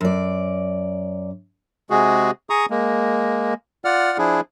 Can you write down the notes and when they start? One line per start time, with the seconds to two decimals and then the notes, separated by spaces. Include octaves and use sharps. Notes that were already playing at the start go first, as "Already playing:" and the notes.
0.01 F#2 D5
1.90 C3 G#3 F#4 G#4
2.50 G#4 A#5 C#6 D#6
2.70 G#3 A#3
3.85 F4 D5 F#5 F6
4.18 F3 D4 E4 G#4